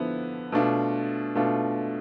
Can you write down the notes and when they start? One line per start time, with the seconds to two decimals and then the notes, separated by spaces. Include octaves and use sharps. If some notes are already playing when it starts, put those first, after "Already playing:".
Already playing: D3 F3 B3 E4
0.52 B2 A3 D4 F4
1.35 B2 A3 D4 F4